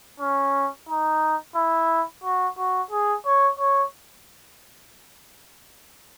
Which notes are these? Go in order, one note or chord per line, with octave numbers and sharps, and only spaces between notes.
C#4
D#4
E4
F#4
F#4
G#4
C#5
C#5